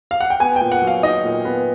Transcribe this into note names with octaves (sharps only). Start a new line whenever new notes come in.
F5
F#5
G5
B3 G#5
A#2 G5
F#5
F#3
F5
D#4 D#5
A#2
B3